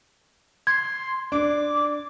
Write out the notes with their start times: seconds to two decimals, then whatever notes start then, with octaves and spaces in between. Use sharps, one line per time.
0.67 C6 G#6
1.32 D4 D6